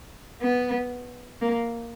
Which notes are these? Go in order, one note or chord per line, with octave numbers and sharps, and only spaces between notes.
B3
A#3